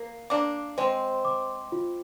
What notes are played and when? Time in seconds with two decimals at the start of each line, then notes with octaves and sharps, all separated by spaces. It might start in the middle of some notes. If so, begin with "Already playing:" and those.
Already playing: A#3 A#4
0.30 A#3 D4 D6
0.78 G#3 C4 C5
1.25 D6
1.72 F4